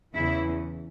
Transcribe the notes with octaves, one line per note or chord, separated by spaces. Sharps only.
E2 C#3 E3 E4